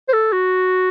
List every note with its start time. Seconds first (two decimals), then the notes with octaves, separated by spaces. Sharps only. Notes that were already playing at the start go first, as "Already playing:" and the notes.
0.09 C5
0.13 A4
0.33 F#4